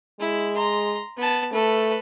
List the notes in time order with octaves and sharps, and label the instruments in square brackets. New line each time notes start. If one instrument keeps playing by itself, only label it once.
[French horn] G#3 [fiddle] E4
[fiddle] A#5 C6
B3 A5
[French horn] A3 [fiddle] A4 B4